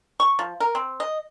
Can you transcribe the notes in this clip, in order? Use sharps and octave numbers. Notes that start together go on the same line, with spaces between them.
C#6
F3
A#4
C4
D#5